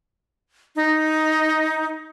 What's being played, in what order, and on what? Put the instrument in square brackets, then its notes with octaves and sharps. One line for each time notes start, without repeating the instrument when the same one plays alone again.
[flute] D#4